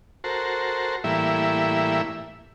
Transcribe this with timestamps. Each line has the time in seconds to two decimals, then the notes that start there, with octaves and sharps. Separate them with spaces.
0.24 F#4 A4 A#4 C5
1.04 A2 E3 G3 A#3 E4 E5